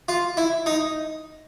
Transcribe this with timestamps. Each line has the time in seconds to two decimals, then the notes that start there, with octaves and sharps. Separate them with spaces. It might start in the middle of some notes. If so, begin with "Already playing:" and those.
0.08 F4
0.37 E4
0.66 D#4